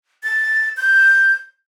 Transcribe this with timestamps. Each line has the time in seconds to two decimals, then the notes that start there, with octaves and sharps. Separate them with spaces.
0.23 A6
0.77 G6